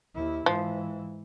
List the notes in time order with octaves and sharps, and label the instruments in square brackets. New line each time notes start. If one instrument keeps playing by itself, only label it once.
[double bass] D#2 E4
[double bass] G#2 E3 [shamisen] F3